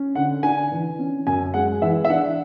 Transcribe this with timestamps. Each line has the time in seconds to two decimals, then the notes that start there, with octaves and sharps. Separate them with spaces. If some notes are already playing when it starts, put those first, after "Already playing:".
Already playing: C#4
0.15 D3 F#5
0.43 D4 G#5
0.72 E3
0.99 C#4
1.27 F#2 G#5
1.54 G#3 F#5
1.82 E3 E5
2.05 E5
2.09 D4 F#5